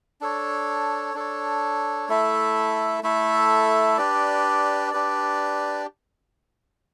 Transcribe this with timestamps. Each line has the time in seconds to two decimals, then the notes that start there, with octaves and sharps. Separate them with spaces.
0.21 D4 A4 C#5
1.15 D4 A4 C#5
2.09 A3 E4 A4 E5
3.03 A3 E4 A4 E5
3.97 D4 G4 B4 D5
4.91 D4 G4 B4 D5